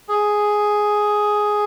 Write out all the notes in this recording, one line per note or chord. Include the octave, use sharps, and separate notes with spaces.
G#4